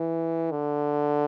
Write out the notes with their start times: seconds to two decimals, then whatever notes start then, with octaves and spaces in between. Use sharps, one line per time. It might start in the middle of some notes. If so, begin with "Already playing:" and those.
Already playing: E3
0.51 D3